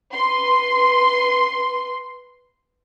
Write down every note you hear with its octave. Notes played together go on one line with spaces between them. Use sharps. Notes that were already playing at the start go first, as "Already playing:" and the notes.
B4 C6